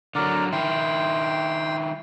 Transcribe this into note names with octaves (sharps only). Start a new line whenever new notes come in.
D3 F#3 A#4 D5
D#3 E4 G5 C6